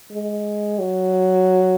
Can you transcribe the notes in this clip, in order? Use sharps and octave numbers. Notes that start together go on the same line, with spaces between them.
G#3
F#3